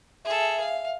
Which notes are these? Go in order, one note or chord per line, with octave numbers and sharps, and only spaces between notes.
G#4 A4 E5
F5